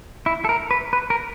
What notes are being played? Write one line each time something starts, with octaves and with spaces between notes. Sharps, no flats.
E4
A4
A#4
B4
B4
A#4